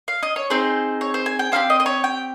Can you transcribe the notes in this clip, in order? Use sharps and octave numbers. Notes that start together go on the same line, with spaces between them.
F5
D#5
C#5
C4 D#4 G#4 C5
C#5
C5
G#5
G5
C4 D#4 G4 F5
D#5
D#5
C#5
G5